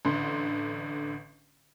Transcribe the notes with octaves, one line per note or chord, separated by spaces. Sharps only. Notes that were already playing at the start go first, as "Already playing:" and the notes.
A1 D3 C6